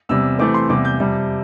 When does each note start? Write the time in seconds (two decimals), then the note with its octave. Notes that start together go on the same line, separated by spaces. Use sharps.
0.09 E2 C3 G3 E6
0.39 C3 E3 A3 C4 D6
0.54 C6
0.69 E2 C3 G3 D6
0.85 G6
1.00 F2 C3 G3